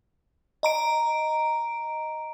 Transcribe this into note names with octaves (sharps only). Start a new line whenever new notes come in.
D#5 A#5 D7